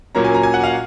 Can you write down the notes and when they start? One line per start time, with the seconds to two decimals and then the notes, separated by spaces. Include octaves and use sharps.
0.15 A#2 F#3 A#3 C#4 A#5
0.24 G#5
0.35 A#5
0.43 G#5
0.54 F#5
0.64 F5